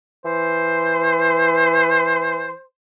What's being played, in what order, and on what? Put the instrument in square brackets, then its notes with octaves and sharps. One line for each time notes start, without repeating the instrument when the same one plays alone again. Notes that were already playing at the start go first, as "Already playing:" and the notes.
[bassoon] E3 [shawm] C5